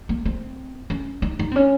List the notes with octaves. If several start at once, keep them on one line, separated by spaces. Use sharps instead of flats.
A#3
C4
C#4
D#4
D#4
C4
C#4